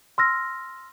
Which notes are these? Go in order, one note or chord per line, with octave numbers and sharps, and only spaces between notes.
C6 E6 F6 A#6